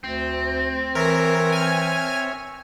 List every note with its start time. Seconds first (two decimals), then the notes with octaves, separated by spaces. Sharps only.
0.04 D2 C4
0.95 E3 A#4 C#5 E5
1.52 G#5 F6